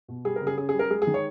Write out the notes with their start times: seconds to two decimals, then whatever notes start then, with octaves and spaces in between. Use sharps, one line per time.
0.08 B2
0.25 G3 G#4
0.36 A#4
0.41 C#3
0.47 G#4
0.57 C#4 G#4
0.69 G#4
0.74 G3
0.79 A#4
0.90 G#3 G#4
1.02 G#4
1.07 D#3
1.14 C#5